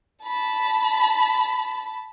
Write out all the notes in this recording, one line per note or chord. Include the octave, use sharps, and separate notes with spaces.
A5 B5